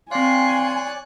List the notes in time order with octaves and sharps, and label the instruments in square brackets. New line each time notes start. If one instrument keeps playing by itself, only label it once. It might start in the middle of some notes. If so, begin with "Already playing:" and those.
[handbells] C4 F5 [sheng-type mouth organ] C#5 D5 F#6 [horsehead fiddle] G#5 [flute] C6